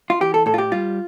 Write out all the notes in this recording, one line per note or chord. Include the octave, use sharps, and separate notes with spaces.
F4
E3 G4
A4
A2 A4
F4
G4
G3 F4